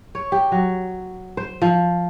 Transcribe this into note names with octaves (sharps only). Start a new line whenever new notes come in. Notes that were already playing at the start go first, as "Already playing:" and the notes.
C#5
G4
F#3
C5
F3